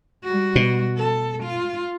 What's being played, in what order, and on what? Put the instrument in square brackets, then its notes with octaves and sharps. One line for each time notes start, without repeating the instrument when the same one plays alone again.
[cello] G3 F#4
[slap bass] B2
[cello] A4
F4